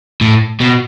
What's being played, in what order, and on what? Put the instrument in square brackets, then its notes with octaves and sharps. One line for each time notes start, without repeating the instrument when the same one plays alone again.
[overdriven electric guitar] A2
B2